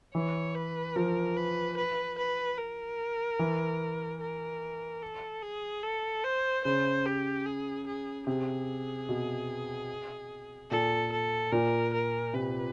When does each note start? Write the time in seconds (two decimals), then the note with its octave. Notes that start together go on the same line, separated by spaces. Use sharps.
0.15 E3 C#5
0.55 B4
0.96 F3 A#4
1.37 B4
1.77 B4
2.18 B4
2.58 A#4
3.39 E3
4.20 A#4
5.02 A4
5.43 G#4
5.83 A4
6.24 C5
6.64 C#3 C5
7.06 G4
7.46 G#4
7.87 G#4
8.27 C3 G#4
9.09 B2
10.71 A#2 A4
11.12 A4
11.52 A#2 A#4
11.93 A#4
12.34 C3 B4